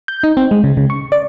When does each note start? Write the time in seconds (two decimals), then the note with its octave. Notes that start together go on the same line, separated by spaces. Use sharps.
0.08 G6
0.23 D#4
0.37 C4
0.51 G#3
0.64 C#3
0.77 C#3
0.90 C#6
1.12 D5